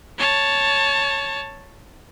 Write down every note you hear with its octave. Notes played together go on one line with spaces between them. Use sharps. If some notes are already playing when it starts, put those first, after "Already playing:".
C#5 A5